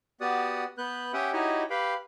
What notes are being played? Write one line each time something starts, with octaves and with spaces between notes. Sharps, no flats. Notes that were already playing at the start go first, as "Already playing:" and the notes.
B3 F#4 G4 D5 F#5 D#6
B3 B4 F#6 G6
C#4 G4 E5 F#5 G5 D#6
D#4 E4 F#4 G4 C#5 D#5
G4 B4 F5 G5 B5